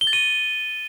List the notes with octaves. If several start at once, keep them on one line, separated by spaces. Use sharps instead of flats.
G7
A6
D#7